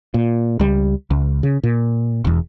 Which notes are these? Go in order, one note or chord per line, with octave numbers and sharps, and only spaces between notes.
A#2
C#2 G3
C#2
C#3
A#2
E1 E2